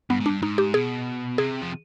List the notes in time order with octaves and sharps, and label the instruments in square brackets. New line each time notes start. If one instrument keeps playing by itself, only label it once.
[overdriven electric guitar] G2 [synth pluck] B3
[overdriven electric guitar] G#2
[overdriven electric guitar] G2 [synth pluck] D4
[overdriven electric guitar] G#2 [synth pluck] D#4
[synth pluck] G4
[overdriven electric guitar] B2 [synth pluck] G#4
[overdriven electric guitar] C3 [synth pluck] G#4
[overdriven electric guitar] F3